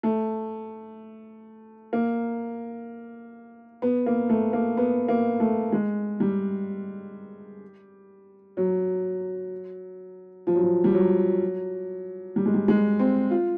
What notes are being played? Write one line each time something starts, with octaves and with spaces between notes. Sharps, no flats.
A3
A#3
B3
A#3
A3
A#3
B3
A#3
A3
G#3
G3
F#3
F3
F#3
F3
G3
F#3
G3
G#3
G3
G#3
C4
F4